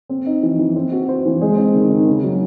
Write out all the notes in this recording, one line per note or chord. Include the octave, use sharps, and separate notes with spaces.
C4
D#4
E3
E3
C4
F#4
C5
E3
G#3
C4
D#3
D#3
C#3
F#3